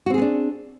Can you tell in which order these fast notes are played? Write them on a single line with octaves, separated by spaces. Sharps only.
F#4 C4 G#4 B3 D4